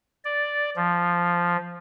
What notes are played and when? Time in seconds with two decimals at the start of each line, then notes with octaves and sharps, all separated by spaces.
0.25 D5
0.76 F3